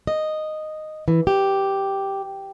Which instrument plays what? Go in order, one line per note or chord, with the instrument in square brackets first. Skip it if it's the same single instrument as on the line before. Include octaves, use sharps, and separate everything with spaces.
[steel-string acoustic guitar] D#5
E3
G4